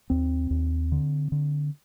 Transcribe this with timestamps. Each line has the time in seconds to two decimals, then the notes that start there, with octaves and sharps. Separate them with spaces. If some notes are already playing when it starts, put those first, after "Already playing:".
0.10 D#2 C4
0.50 D#2
0.92 D3
1.32 D3